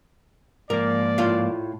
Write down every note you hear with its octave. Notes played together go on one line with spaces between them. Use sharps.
G#2 F3 A#3 A#4 D5
A2 F4 F5